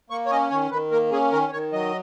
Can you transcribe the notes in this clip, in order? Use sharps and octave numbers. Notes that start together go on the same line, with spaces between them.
A#3 C#6
C#5
C#4 D#5
D#3 C#5
D#3 B4
A#3 A#4
C#4 G#4
D#3 A#4
D#3 C#5
F#3 D#5